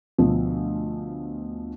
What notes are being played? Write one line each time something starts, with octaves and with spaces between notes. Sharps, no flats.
D2 B2 F3